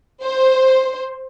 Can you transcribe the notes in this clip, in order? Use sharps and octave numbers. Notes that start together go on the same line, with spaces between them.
C5